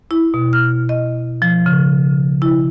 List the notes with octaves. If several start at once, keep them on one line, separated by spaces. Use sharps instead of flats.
E4
B2
F6
D#5
F3
C#3
E4